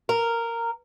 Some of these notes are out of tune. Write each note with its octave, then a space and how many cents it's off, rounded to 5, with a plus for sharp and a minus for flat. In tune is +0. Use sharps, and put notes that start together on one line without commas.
A#4 -10